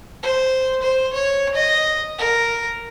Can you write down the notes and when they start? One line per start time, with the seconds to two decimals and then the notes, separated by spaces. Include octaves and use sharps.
0.23 C5
0.82 C5
1.13 C#5
1.55 D#5
2.18 A#4